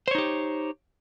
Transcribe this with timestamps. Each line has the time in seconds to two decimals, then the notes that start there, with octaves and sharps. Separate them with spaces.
0.08 C5
0.11 C#5
0.15 D#4
0.18 G4